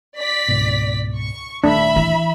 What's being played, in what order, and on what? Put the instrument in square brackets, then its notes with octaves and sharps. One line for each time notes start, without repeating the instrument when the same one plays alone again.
[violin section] D5 B6
[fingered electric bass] C#2 G#2 B2
[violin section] C#6
[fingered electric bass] D#1 D#2 A3 [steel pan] D4 [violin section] E5 B5
[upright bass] E3